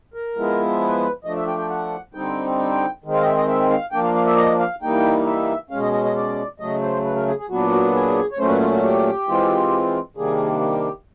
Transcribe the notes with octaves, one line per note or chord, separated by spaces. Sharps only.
A#4
F3 G#3 B3 E4
B4
F3 A3 D4 D#5
E5
G5
G5
F#5
D3 G3 C4 D#4 G5
G5
D#3 G#3 C4
F5
D#5
E5
D#5
E5
F5
F3 A#3 D4 G5
F5
F5
E5
D#5
F5
E3 G3 A#3 D#4 G5
E5
B2 G#3 C#4 F5
D#5
D#5
D#5
D5
C#3 F#3 A3 D#5
C5
B4
A#4
G#4
G#4
A#2 F#3 B3 D4 F#4
F#4
G#4
C#5
A#2 F#3 A3 C#4 C5
B4
F4
F#4
G4
E3 G#3 C4 F4
C3 D#3 G3 A#3 D4 G#4
G4